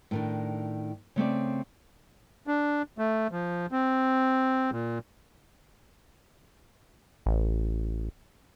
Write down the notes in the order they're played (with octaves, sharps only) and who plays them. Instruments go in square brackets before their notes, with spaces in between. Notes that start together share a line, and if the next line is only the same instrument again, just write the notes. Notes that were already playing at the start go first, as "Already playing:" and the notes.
[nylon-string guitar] A2 D#3 D4
C#3 A3 C4 D5
[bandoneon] D4
A3
F3
C4
A#2
[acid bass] A1